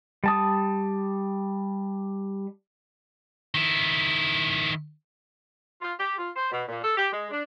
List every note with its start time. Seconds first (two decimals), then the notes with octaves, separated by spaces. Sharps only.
0.24 G3 A5 D#6
3.55 D#3 E4
5.81 F4
5.98 G4
6.18 F4
6.36 C5
6.51 B2
6.68 A#2
6.84 A4
6.97 G4
7.12 G#3
7.31 D4